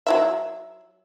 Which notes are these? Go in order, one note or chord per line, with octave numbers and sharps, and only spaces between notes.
F#3 E4 E5